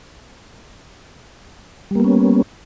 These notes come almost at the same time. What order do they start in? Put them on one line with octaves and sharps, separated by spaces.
G3 A#3 B3 C#4